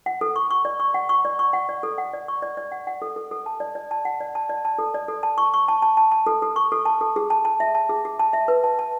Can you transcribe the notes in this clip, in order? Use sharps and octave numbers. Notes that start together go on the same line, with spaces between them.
F#5
A4
C#6
C#6
D5
C#6
F#5
C#6
D5
C#6
F#5
D5
A4
F#5
D5
C#6
D5
D5
F#5
F#5
A4
A4
A4
A5
D5
D5
A5
F#5
D5
A5
D5
A5
A4
D5
A4
A5
C#6
C#6
A5
A5
A5
A5
A4
A4
C#6
A4
A5
A4
G#4
A5
A5
E5
A5
G#4
G#4
A5
E5
B4
A5
A5